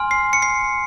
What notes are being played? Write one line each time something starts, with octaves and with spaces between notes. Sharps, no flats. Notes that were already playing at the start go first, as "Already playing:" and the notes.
Already playing: G#5 C6 F6
C7
C#7
C7